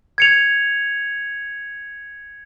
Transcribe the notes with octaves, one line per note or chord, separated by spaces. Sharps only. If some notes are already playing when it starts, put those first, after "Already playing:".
G#6 C#7 F7